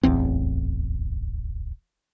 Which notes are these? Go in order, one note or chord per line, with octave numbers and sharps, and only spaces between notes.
D1 A1 E2 C4